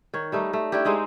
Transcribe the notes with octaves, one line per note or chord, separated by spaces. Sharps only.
D#3 C#5
G3 A3 D#4
A3
A3 D4 E4 G4
G#3 C4 D#4 D5